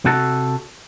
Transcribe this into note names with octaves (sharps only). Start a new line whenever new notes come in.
C3 F#4 A4